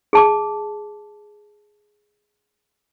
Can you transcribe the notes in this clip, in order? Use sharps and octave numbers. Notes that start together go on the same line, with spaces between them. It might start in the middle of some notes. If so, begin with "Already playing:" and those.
G#4 A5 D6